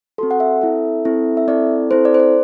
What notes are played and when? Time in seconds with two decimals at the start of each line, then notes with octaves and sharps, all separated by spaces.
0.18 C4 F#4 A4 C6
0.31 F#5
0.40 E5
0.62 C4 E4 A4
1.05 C4 E4 A4
1.37 E5
1.48 C4 E4 A4 D5
1.91 C4 E4 A4 C5
2.05 D5
2.14 C5
2.20 D5